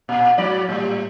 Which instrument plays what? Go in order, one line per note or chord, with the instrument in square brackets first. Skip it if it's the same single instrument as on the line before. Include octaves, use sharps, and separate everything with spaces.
[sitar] A#2
G#2 F#3 D5
A2 G3